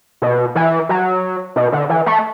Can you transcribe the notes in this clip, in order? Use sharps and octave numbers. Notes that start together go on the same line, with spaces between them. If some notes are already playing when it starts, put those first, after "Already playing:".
B2
E3
F#3
B2
D3
E3
A3